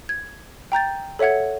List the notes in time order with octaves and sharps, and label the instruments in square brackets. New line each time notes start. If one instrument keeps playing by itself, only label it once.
[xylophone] G#6
G5 A#5 G6 A6
A4 C#5 E5 F#5 G#6